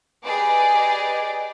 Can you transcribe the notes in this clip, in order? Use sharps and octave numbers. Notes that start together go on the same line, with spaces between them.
G4 G#4 B4 D5 D#5